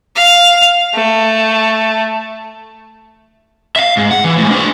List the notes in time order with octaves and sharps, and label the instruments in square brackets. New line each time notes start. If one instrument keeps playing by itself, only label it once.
[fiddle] F5
A3
[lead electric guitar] E5 F5
G#2
F#5
E3
A2 G#3
D4 C5